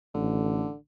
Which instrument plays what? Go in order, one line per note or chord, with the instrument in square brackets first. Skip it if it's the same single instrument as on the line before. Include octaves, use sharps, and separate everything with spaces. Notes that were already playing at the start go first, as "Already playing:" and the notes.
[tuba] A1 [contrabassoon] D3